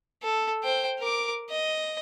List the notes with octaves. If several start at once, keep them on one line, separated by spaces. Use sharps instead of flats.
A4
C5 G5
A#4 D6
D#5